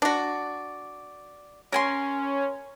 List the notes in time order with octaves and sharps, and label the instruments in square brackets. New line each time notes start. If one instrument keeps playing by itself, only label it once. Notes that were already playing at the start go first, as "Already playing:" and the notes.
[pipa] D4 F#4 [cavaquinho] D5
[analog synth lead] C#4 [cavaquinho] A#4 G#5 C6